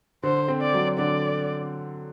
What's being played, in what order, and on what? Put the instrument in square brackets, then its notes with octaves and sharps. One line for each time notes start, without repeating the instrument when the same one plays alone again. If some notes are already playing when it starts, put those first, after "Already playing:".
[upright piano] D3 [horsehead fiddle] C5
[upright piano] C4
[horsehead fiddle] D5
[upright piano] F#3
[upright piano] D3 [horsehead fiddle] D5